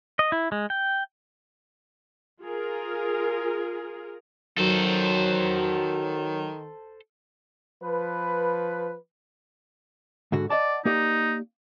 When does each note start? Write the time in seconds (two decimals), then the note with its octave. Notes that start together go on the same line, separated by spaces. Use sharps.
0.19 D#5
0.32 E4
0.52 G#3
0.70 G5
2.42 F4 G#4 A#4
4.58 D#3 F#3 A4 C5
7.82 F3 B4
10.32 G#2 D3 F#4
10.50 D5 D#5 F#5 A5
10.85 A#3 D#4 G4 D5